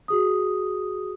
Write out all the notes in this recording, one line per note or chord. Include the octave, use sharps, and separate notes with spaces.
F#4 G#4 D#6